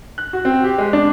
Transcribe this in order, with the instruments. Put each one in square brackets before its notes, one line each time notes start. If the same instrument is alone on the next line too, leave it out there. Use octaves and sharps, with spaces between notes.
[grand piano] F#6
F#4
C4
G4
G#3
D4